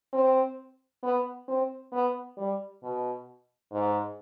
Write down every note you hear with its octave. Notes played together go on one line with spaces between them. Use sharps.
C4
B3
C4
B3
G3
B2
G#2